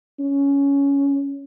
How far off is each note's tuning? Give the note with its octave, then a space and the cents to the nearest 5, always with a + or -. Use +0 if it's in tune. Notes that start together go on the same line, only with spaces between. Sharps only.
C#4 +10